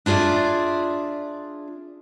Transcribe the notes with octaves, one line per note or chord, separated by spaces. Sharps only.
D4 F4 G#4 D5 E5